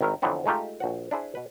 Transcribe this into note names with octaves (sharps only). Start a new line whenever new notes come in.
G#1 D#3 E4 A#4
F2 D3 E3 F#3 B3 C4
G#3 A3 D#4 F4 G4
A#1 F#4 F#5
D4 E4 G#4 C5
B2 B4